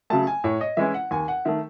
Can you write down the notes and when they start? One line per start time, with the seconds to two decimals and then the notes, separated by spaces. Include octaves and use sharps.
0.10 C#3 F#3 A3 A5
0.27 G#5
0.44 A2 C#5
0.61 D#5
0.77 E3 G#3 C#4 E4 E5
0.94 F#5
1.11 D#2 G#5
1.28 F#5
1.45 D#3 A3 E5